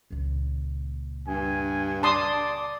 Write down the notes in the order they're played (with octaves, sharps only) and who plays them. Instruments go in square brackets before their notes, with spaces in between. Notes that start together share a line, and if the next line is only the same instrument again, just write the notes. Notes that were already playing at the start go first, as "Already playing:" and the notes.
[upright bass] C#2 A#2
[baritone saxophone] G2 [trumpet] G#5
[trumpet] D5 [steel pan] A5 C6 D#6